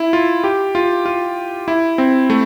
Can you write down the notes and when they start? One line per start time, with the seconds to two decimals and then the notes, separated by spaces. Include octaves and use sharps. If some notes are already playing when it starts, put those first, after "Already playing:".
Already playing: E4
0.13 F4
0.44 G4
0.75 F4
1.06 F4
1.68 E4
1.98 C4
2.30 A3